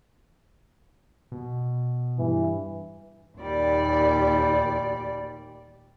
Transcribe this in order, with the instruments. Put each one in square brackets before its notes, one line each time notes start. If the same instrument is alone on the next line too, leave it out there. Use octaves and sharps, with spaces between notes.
[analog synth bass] B2
[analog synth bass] G2 [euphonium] E3
[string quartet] D#2 A#2 G3 D5